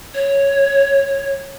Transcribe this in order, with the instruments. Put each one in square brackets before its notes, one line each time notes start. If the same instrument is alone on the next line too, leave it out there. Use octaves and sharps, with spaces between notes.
[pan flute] C#5